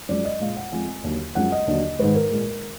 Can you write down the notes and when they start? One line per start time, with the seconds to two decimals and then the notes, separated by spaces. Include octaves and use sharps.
0.09 F#2 F3 G#3 D5
0.25 D#5
0.40 A#2 G#3 F5
0.56 F#5
0.72 F2 F3 G#3 G#5
1.04 D#2 D3 F#3
1.35 F#2 F3 G#3 F#5
1.52 D#5
1.67 D#2 D3 F#3
1.99 G#2 D#3 G#3 B4
2.15 A#4
2.31 A#2 G#3